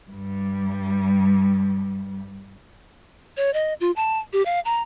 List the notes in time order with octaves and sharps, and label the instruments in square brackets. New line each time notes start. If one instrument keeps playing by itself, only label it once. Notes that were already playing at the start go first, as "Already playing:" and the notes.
[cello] G2 G3
[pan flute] C#5
D#5
F4
A5
G4
F5
A#5